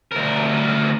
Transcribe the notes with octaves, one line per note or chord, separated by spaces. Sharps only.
D2 A#4